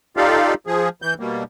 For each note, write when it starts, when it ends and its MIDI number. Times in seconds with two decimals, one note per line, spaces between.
0.17 0.54 63
0.17 0.54 65
0.17 0.54 67
0.17 0.54 69
0.17 0.54 74
0.17 0.54 77
0.67 0.89 53
0.67 0.89 68
1.02 1.14 52
1.02 1.14 91
1.20 1.43 47
1.20 1.43 55
1.20 1.43 58